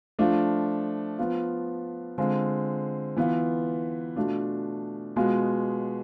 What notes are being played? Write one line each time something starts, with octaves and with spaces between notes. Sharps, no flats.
F3 A3 D4 F4
F3 B3 F4
D3 G#3 C4 F4
E3 B3 F4
B2 A3 D4 F4
B2 G#3 B3 F4